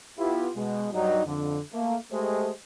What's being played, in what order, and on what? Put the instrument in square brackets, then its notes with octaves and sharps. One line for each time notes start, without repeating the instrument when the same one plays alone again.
[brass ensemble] B3 E4 F4 G4
B2 G#3
G2 F#3 G3 D#4
F2 D3
A3 A#3
G#3 A3 G4 C5